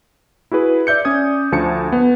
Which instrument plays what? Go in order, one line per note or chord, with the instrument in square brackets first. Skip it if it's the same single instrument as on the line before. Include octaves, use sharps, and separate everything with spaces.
[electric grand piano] E4 F#4 G#4 B4
D5 E5 G6 C#7
C#4 D5 D#6 G#6
D2 F3 A5 C#7
B3